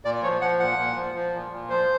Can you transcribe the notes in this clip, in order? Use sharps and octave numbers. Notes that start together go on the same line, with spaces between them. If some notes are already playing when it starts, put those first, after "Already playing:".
A#2 D5
F3 C#5
F3 F#5
A#2 F#5
A#2
F3
F3
A#2
A#2
F3 C5